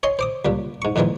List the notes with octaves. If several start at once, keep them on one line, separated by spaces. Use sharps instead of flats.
C#5 D#5 G#5 C6
C5 D6 D#6
C#2 A#2 G3
G#2 C#6
F2 A#2 D#3 E3 G#3